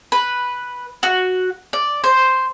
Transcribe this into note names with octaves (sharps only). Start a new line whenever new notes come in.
B4
F#4
D5
C5